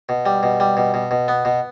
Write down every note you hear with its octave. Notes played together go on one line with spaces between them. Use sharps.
B2
G3
B2
G3
B2
B2
B2
B3
B2